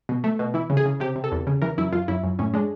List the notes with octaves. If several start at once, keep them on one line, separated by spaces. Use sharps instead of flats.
B2
A3
B2
E3 E4
C#3
G#4
C#3
C3 G4
C3
A4
E2
C#3
E3 A#4
F#2 E4
F#2 F4
F#2 E4
F#2
A2 C#4
G#3 D4